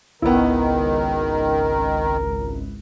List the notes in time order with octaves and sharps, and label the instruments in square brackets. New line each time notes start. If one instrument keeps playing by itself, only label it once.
[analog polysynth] G#1 C#2 [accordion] D#3 [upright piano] B3 E4 [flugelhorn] A#4